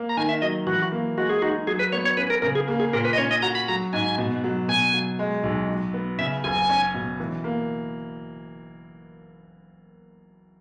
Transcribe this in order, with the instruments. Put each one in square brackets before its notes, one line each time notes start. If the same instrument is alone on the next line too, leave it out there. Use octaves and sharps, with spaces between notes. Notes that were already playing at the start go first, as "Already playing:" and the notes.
Already playing: [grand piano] A#3
[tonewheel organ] A#5
[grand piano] D#3 [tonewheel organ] G#5
[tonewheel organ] E5
[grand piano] F#3 [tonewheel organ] D#5
[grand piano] E3 [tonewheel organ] F#4
[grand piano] A#3
[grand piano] G#3 [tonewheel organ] F#4
[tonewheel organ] G#4
[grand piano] D#4 [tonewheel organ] F#4
[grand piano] F#3 [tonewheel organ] G#4
[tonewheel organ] B4
[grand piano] B3 [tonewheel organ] C#5
[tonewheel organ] C#5
[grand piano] C#4 [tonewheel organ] B4
[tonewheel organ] A#4
[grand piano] C#3 [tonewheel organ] A#4
[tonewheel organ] G#4
[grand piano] A#3
[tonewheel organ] G#4
[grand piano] A#2 [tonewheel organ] A#4
[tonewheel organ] B4
D#5
[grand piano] C#4 [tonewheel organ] C#5
[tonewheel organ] D#5
[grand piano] F#4 [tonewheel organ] A#5
[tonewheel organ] B5
[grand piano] F#3 [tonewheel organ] A#5
[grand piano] G#2 [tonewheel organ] G#5
[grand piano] B2
F#3
[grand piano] B2 [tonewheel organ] G#5
[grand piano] F#3
G#3
B1
F#3
B3
[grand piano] C#3 [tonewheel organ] E5
[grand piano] F#1 [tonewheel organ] G#5
[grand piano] C#4
B2
E3
A#3